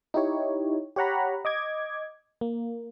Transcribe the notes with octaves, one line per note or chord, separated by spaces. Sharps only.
D#4 E4 G4 C#5
G4 C#5 F#5 A#5 B5
D#5 D6 G#6
A#3